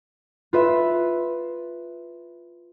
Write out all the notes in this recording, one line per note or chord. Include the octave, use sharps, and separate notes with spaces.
F4 B4 E5